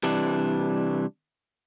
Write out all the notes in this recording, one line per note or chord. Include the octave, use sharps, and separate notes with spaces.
C3 E3 G3 D4